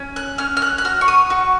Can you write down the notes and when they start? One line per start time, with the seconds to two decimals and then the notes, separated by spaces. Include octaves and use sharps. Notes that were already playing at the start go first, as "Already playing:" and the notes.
Already playing: C#4
0.16 F#6
0.38 C#4 F6
0.57 F6
0.62 F#6
0.78 F#6
0.84 F#4 F6
1.01 C#6
1.08 D#6
1.30 F#4 C#6